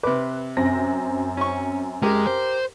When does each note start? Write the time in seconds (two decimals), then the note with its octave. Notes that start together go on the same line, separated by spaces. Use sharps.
0.03 C3 B4 D6
0.57 F#2 C4 A#6
1.37 C#4 C#6
2.02 G#3 G4 A#4
2.27 C5